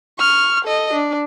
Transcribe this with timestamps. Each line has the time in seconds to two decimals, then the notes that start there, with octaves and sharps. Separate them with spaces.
0.18 C#6 F6
0.65 A4 D#5
0.93 D4